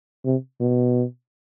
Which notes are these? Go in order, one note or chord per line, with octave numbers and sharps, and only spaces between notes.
C3
B2